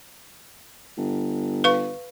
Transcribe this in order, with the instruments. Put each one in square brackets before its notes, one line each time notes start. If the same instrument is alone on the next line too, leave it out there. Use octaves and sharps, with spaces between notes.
[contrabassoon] G1
[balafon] B4 F5 C#6